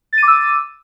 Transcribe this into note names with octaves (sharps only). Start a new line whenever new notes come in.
D6 E6 A6 D#7